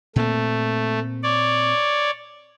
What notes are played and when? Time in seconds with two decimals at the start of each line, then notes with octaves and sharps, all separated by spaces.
0.16 A#2 A3 A#3 C4
1.23 C#5 D5